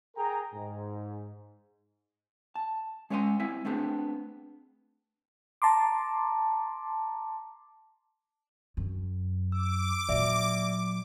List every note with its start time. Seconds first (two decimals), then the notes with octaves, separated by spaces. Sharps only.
0.16 G#4 A#4 G5 A#5
0.54 G#2
2.55 A5
3.10 G#3 C#4 C#5 E5 G#5 C6
3.40 C4 E4 E5 G#5
3.65 A3 B3 C4 D4 G#4
5.62 A5 A#5 C6 D6
8.77 F#2
9.52 D6 E6
10.09 A#2 F#3 D5 E5